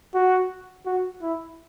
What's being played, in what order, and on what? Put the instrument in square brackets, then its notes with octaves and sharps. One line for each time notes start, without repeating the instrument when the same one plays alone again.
[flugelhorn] F#4
F#4
E4